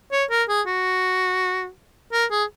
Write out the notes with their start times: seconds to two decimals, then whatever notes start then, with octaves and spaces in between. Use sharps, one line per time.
0.12 C#5
0.30 A#4
0.49 G#4
0.67 F#4
2.13 A#4
2.31 G#4